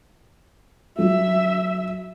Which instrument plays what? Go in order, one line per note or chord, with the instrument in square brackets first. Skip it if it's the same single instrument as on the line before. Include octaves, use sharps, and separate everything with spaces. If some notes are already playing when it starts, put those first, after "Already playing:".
[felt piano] F#3 [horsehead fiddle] E5